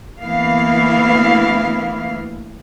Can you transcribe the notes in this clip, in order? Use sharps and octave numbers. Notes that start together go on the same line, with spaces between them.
D2 E3 A#3 B3 E4 F5